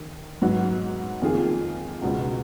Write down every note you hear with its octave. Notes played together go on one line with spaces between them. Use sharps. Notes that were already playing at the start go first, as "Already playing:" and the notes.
Already playing: D#3
G#2 F#3 B3 F#4
F2 D#3 A#3 F4 G#4
C#2 B2 G#3 B3